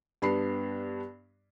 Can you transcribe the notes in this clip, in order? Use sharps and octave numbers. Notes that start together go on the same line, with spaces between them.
G2 B3 D4 B5 C7